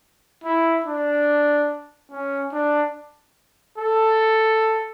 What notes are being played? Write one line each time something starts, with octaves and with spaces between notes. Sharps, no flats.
E4
D4
C#4
D4
A4